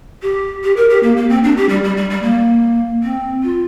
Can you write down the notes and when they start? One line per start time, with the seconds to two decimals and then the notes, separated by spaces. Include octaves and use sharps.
0.22 G4
0.63 G4
0.76 A#4
0.89 G4
1.03 A#3
1.16 A#3
1.30 C4
1.43 D4
1.57 G4
1.69 G3
1.84 G3
1.97 G3
2.10 G3
2.22 A#3
3.03 C4
3.43 F4